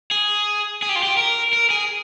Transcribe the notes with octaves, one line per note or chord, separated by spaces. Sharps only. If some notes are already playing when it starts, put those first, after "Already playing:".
G#4
G#4
G4
F4
G4
A#4
A#4
G#4